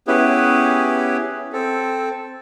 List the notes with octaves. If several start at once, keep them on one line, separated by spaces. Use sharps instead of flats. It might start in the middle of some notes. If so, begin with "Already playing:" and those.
B3 C#4 E4 G4 G#4 B4
C4 A4